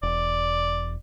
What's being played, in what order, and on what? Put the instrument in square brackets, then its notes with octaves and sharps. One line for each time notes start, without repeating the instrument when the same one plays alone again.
[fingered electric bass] E1 [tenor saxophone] D5